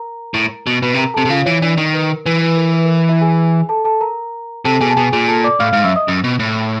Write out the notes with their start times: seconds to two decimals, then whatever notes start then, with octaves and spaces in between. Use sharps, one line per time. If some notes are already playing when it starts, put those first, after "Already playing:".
Already playing: A#4 A#5
0.34 A2
0.67 B2
0.82 B2 B4 B5
0.94 C3
0.98 A#4 A#5
1.14 C3 A4 A5
1.25 C3
1.29 C#3 F4 F5
1.45 E3 C#5
1.61 E3 D4 D5
1.77 D#3
1.94 B4
2.09 A#4
2.26 E3 B4
2.41 B4
2.57 A#4
2.74 B4
2.85 A#4
2.97 B4
3.09 E4 E5
3.21 G#4 G#5
3.69 A4 A5
3.85 A4 A5
4.01 A#4 A#5
4.65 C3 A4 A5
4.80 B2 G#4 G#5
4.90 A5
4.96 B2 G#4 G#5
5.12 A#2 G#4 G#5
5.28 A4 A5
5.44 D5 D6
5.60 A2 F5 F6
5.72 G#2 F5 F6
5.84 F#2 E5 E6
5.96 D#5 D#6
6.08 F#2
6.24 B2
6.39 A2